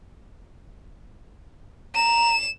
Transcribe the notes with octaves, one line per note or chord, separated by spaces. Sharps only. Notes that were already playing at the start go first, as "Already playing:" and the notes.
A#5 E7